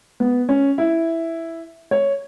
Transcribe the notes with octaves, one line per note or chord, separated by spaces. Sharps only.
B3
C#4
E4
C#5